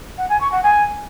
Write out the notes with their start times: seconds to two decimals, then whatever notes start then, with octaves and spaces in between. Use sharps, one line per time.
0.18 F#5
0.29 G#5
0.40 C#6
0.52 F#5
0.63 G#5